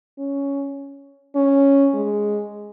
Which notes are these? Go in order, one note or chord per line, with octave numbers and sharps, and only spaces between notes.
C#4
C#4
G#3